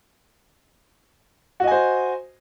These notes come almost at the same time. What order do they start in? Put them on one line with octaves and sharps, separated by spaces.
F#4 D#5 G#5 C5